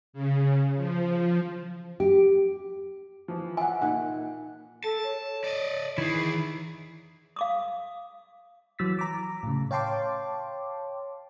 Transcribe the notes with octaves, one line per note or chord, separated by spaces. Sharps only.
C#3
F3
G4
E3 F3
E5 F#5 G#5
A#2 D#4 F#5
A4 A5
C#5
D5 D#5
D#3 E3 E4 G#4
F5 D6 D#6
E3 F#3 E6 A6 B6
A#5 D6
A2 C#3
C#5 F5 G5 A5 C6 D6